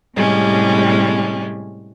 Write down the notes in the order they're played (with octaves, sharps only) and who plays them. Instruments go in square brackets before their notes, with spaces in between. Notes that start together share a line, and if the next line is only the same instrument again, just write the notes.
[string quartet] A2 C3 G3 G#3 C#4